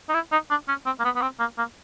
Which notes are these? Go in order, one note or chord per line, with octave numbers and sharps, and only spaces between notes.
D#4
E4
D#4
D4
C#4
C4
A#3
B3
B3
C4
A#3
A#3